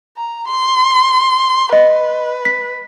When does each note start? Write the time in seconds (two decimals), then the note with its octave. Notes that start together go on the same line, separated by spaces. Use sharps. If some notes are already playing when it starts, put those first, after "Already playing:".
0.17 A#5
0.48 C6
1.73 B4 D#5
2.45 B6